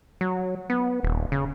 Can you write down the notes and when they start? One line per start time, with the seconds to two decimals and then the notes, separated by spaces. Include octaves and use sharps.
0.21 F#3
0.70 B3
1.03 D#1
1.32 C#3